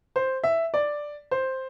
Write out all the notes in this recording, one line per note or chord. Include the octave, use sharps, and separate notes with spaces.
C5
E5
D5
C5